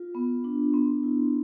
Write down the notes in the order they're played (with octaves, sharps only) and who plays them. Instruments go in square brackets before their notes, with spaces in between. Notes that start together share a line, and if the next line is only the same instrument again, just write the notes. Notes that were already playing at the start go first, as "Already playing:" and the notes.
Already playing: [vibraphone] F4
B3
D4
B3 C6
E4